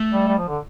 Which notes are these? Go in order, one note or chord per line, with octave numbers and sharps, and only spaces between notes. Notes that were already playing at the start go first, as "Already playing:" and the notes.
Already playing: A3
G3
G3
F3
D3